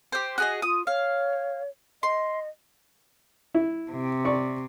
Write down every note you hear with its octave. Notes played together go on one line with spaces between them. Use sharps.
G4 C5
F#4 G#4 D#5
F4 D#6
C#5 F5
D#5 C6
E4
C3
D5 C#6